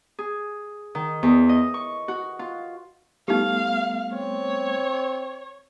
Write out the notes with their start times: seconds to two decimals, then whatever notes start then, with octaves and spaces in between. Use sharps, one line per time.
0.19 G#4
0.95 D#3
1.23 E2
1.49 D#5
1.74 C#6
2.08 F#4
2.39 F4
3.28 G3 A3 B3 D#4 G4 F5
4.13 C4 C#5